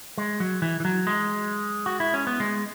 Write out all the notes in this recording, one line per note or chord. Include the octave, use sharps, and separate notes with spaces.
G#3
F#3
E3
E3
F#3
G#3
F#4
E4
C#4
B3
G#3